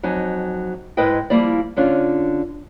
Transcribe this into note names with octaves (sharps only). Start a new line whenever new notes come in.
F2 F#3 D#4 G#5
G#2 G#3 E4 B4 D#5 G5
F3 G3 A#3 E4 D5
D3 C#4 D4 F4